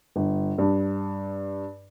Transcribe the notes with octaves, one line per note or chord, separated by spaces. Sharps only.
G1
G2